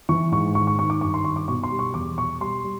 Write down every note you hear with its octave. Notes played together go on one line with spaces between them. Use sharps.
E3 C#6
G#2 C#6
D#3 C#6
C#6
D#3 C#6
D6
G2 C#6
C6
D#3 C#6
D6
B2 C#6
C6
G3
C#6
E2 D6
B2 C#6
G3 C6
G3